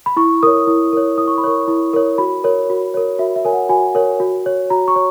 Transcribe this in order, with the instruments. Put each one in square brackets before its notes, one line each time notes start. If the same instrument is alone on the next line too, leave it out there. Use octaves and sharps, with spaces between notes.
[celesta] B5
E4 C#6
A#4 C#5 D#6
E4
A#4 C#5
E4 D#6
C#6
B5
A#4 C#5 C#6
E4
A#4 C#5
F#4 B5
A#4 C#5
F#4
A#4 C#5
F#4 E5
E5
A#4 C#5 G#5
F#5
F#4 G#5
A#4 C#5
F#4
C#5
F#4 A#5
C#6
C#5